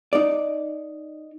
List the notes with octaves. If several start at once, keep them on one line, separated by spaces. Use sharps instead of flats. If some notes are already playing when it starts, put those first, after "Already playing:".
D#4 D5